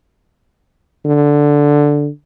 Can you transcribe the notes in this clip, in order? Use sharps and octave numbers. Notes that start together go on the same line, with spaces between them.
D3